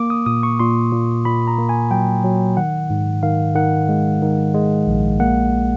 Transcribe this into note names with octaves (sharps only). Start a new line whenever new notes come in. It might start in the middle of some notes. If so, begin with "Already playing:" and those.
Already playing: A#3 D6
D#6
A#2 D#6
C#6
A#2 C6
A#2
A#2 B5
A#5
A#3
G#5
F#3 G5
F#3
D#3 F#5
G#2
D#3 F5
D#3 F#5
G#3
D#3
G#3
A#1
A#3 F#5